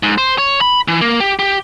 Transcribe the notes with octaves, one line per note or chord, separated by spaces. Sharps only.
G#2
C5
C#5
B5
E3
A#3
G4
G4